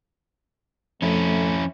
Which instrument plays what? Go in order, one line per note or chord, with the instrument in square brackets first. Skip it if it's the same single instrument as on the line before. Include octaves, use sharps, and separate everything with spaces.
[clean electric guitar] F2 [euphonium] A3 [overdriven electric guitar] C#4 E4